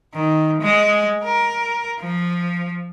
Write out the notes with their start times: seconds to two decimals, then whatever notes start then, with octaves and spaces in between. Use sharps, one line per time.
0.14 D#3
0.61 G#3
1.24 A#4
2.01 F3